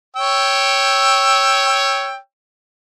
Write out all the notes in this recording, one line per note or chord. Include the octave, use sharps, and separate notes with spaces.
C#5 G5 E6